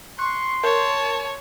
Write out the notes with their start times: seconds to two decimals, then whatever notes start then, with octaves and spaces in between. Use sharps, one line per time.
0.19 C6 C#6 F#6
0.63 A#4 C#5 A5